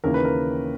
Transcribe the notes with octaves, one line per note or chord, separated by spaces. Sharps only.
D#2 C#3 E3 A#3 A#4
B4
A#4